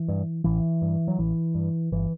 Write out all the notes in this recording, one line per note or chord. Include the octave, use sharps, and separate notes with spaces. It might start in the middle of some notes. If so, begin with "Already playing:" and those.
Already playing: E3
G2
A1 E3
G2
F#3
A1 E3
G2
G1 E3